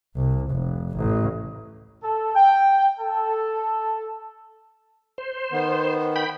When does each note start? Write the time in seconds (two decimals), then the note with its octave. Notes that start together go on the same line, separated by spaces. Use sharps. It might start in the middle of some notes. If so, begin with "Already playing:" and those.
0.16 C2
0.50 F1
0.96 A1
2.03 A4
2.36 G5
3.00 A4
5.18 C5
5.52 D#3 B3
6.16 G5 B5